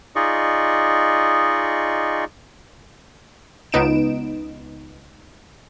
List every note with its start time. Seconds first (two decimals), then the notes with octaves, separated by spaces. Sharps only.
0.16 D#4 F4 G#4 D5 D#5 C#6
3.72 C#2 B3 D#4 D7 E7